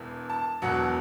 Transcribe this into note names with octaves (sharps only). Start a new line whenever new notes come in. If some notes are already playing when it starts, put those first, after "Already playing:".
Already playing: E1 E2 E3
A5
E1 E2 B2 F#3 F#5